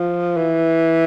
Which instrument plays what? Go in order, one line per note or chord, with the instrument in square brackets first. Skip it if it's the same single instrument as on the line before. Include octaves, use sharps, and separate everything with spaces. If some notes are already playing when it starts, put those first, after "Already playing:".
Already playing: [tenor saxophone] F3
E3